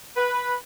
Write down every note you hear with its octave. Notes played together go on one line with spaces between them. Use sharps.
B4